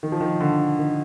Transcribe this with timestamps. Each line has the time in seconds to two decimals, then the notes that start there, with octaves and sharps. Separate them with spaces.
0.03 D#3
0.12 F3
0.21 D#3
0.40 D3
0.79 D#3